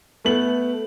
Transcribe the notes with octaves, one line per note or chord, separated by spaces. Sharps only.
A3 B3 F#7